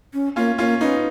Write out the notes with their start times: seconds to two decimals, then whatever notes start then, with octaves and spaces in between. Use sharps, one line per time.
0.14 C#4
0.36 A#3 C#4 F4
0.58 A#3 C#4 F4
0.81 B3 C#4 D#4